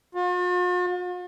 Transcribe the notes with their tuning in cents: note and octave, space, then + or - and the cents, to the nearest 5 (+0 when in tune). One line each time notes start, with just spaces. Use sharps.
F4 +45